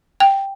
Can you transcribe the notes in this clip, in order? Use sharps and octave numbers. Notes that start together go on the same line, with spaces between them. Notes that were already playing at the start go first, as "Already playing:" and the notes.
G5